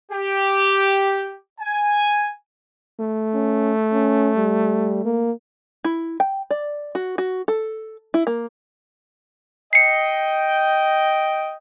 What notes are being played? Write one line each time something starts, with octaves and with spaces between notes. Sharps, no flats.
G4
G#5
A3
C#4
C#4
G3
A#3
E4
G5
D5
F#4
F#4
A4
E4
A#3
D#5 G5 C7 C#7